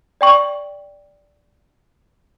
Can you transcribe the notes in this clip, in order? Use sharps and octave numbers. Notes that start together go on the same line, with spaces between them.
D5 G5 C#6